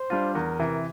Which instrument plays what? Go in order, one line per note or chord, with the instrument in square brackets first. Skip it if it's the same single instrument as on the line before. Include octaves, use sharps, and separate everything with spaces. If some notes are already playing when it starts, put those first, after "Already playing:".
Already playing: [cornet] C5
[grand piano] G3 D4 F4
[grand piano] E2 [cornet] A#4
[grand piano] C3 E3